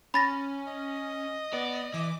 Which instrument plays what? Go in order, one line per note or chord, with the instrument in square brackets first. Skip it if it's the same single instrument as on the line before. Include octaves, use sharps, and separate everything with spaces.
[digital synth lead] C#4 [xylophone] B5 A6 A#6
[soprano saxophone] D#5
[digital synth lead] B3 [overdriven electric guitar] D5
[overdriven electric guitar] E3 [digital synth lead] D6